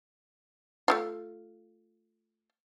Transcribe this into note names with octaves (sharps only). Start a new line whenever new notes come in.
A3 E4 F4